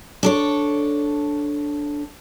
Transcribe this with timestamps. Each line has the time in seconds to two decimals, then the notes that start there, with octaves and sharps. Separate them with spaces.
0.23 D4 A4 C#5